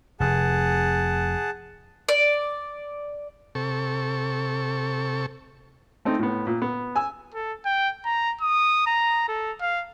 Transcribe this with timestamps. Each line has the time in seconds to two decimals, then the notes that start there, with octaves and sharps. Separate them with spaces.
0.20 F1 G#4 F#5 A5
2.09 D5
3.55 C3 A4 C#6
6.05 A3 C4 D#4
6.19 A2 B3
6.47 A#2
6.62 B3
6.96 G#5 E6
7.34 A4
7.65 G5
8.05 A#5
8.41 D#6
8.87 A#5
9.28 A4
9.61 F5